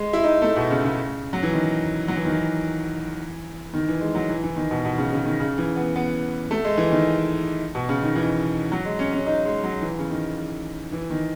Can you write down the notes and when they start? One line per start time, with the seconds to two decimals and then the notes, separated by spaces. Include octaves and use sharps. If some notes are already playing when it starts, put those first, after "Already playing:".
Already playing: G#3
0.13 E4
0.24 D#4
0.42 A3
0.56 B2
0.70 C#3
0.84 C#3
1.33 F#3
1.43 E3
1.53 D#3
2.08 F#3
2.17 E3
2.25 D#3
2.32 E3
3.73 D#3
3.88 E3
4.01 G#3
4.15 F#3
4.29 E3
4.44 E3
4.56 D#3
4.71 B2
4.85 B2
4.98 C#3
5.13 C#3
5.26 D#3
5.40 C#3
5.58 E3
5.76 B3
5.96 B3
6.51 A3
6.65 G#3
6.77 E3
6.91 D#3
7.75 B2
7.89 C#3
8.02 D#3
8.15 E3
8.72 F#3
8.85 G#3
8.99 C#4
9.13 C#4
9.27 D#4
9.45 G#3
9.64 F#3
9.82 E3
9.99 C#3
10.10 D#3
10.92 E3
11.10 D#3